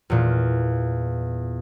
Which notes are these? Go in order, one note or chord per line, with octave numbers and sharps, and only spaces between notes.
E2 A#2